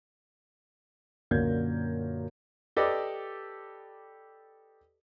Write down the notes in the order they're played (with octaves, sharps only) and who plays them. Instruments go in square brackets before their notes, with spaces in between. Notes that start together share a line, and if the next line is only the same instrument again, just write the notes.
[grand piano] F#2 A#2 D3 A#4 G6 G#6
[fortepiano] G4 A4 B4 D5 D#5